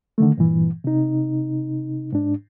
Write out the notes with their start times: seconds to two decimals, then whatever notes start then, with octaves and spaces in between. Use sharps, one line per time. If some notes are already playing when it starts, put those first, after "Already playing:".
0.18 D3 D#3 A3
0.38 G2 A#2 E3
0.84 C3 D#4
2.12 G#2 D4